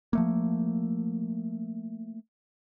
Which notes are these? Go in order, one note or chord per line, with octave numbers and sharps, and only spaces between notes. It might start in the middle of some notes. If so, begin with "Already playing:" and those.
F3 A3 A#3